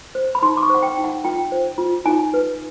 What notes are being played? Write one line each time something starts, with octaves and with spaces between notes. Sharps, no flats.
C5
B5
D#4 C6
D6
C#6
C5 F#5
G5
D#4
F#5
F4 G5
C5
F4
D#4 G#5
B4